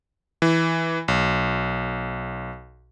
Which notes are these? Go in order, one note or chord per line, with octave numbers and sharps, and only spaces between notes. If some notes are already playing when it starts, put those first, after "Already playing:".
E3
B1